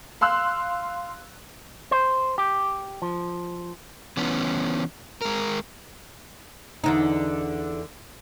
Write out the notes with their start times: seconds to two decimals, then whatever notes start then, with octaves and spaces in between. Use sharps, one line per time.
0.21 F5 C6 E6 F#6
1.91 C5
2.38 G4
3.02 F3
4.17 E3 B3 C#4
5.21 G#3 A#4
6.84 E2 D3 D#4